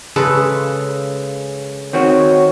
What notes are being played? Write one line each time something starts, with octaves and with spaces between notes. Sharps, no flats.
C#3 G#3 A4 B4
D#3 C4 F#4 C#5